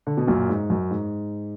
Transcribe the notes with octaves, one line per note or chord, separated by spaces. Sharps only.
D3
B2
F#2 A#2
G#2
F#2
G#2